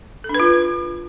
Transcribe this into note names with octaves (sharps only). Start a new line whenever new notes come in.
A4
D4
B4
F4